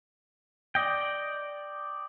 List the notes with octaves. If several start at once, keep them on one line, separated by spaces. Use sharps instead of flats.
D5 D#5 G5